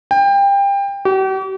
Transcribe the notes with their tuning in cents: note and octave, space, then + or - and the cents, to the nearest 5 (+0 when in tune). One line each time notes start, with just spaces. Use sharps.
G5 +25
G4 -45